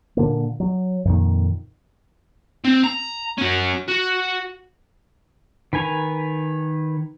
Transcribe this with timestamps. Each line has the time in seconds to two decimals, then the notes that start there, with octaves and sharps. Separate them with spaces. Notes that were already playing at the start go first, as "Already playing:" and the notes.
0.17 A#2 D3 A#3
0.60 F#3
1.05 F2 A#2 D#3
2.65 C4
2.84 A#5
3.38 C#4 F#4
3.88 F#4
5.73 D#3 B4 G#5 A#5